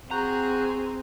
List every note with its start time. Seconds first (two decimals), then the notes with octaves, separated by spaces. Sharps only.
0.11 C4 F#4 G#4 A#5 F#6 G6